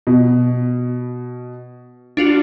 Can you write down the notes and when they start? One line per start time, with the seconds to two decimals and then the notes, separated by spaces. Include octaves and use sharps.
0.07 B2
2.17 D4 F4 F#4